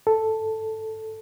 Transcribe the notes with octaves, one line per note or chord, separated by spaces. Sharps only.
A4